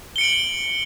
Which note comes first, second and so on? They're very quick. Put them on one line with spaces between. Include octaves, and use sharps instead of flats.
G7 C#7 D7 F#7